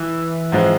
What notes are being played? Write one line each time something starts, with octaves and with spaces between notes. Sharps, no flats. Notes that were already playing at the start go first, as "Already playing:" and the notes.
Already playing: E3
G#2 F3 G#3 C4